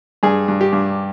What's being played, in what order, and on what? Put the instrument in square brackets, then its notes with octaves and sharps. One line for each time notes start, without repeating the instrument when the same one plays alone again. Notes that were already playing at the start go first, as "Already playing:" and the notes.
[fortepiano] G2 G#4
G2
G4
G2